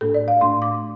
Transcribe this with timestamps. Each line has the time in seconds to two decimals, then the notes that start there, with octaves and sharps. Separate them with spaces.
0.01 A2 A3 D4 A4
0.14 D5
0.28 F5
0.41 A2 A3 D4 C6
0.62 D6